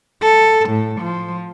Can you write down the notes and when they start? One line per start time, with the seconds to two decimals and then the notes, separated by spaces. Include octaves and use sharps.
0.22 A4
0.70 A2
1.01 F3